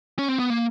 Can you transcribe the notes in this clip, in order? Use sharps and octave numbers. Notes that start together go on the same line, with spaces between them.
C#4
C4
B3
A#3